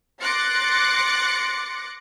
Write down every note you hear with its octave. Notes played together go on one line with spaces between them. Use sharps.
C6 D6 F#6 A6 A#6 C#7